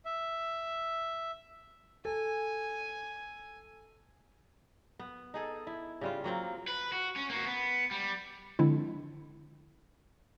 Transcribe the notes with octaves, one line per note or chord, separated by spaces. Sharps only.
E5
A4 G#5
B3
D#4 G#4 A4
E4
C#3 G3 F4
F#3 A#3 C4 F4
B4
F#4
C#4
A#3 F#4
B3
G3
D3 F3 G#3 C4 D4 E4